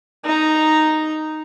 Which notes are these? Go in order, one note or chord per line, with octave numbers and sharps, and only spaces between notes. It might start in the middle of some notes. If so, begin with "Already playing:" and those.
D#4 A#5